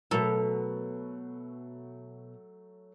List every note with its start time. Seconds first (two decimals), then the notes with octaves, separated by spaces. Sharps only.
0.11 B2 F#3 A3 A4 A#4